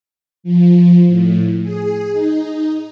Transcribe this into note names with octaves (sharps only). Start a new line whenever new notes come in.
F3
A2
G#4
D#4